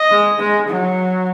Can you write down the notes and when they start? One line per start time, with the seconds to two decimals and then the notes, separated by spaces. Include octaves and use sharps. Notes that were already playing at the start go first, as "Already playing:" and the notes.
Already playing: D#5
0.11 G#3
0.39 G#3
0.68 F#3